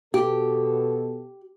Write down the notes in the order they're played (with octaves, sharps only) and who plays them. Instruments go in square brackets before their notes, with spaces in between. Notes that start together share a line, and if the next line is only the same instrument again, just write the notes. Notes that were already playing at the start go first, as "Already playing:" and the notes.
[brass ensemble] B2 A4 [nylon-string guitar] G4